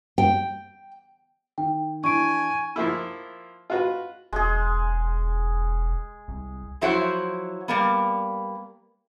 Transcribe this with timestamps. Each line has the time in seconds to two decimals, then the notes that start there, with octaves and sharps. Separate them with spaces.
0.18 G5
1.58 D#3 G5
2.04 E3 D4 G#5 C#6 D7
2.76 F3 A#3 E4
3.70 F4 F#4 B4
4.32 E1 G#3 G#4
6.28 C2
6.81 F3 F#3 E4 C5 C#5 F#5
7.68 G3 A#3 B3